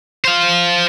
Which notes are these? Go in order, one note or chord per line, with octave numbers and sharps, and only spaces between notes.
C5 F5